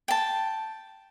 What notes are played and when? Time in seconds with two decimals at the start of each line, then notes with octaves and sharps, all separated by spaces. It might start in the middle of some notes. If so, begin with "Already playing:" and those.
0.08 G5 A5